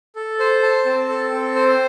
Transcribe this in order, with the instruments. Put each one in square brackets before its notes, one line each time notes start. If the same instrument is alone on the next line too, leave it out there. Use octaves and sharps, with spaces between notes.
[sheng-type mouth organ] A4
C5
A5
C4
A4
C4
C5